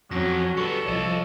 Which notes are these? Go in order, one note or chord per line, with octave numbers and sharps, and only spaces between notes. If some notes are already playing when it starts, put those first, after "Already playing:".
F2 F#3 C#4 A#6
G3 B3 A4 C#6 C#7
C2 F3 C#5 D#5